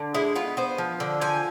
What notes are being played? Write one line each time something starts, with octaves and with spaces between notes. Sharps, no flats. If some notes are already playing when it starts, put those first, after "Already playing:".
Already playing: D3
G#3 E4
B3 F4
B3 C5
F3
D3
F3 G#5